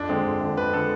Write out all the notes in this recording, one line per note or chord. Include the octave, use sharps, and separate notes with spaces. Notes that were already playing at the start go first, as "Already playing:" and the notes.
Already playing: F2 D4
D3 G#3 C4
F2
D3 G#3
F2 B4
D3 G#3 A4